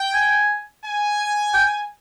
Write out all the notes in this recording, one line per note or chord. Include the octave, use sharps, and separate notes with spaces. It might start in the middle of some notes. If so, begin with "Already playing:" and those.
Already playing: G5
G#5
G#5
G5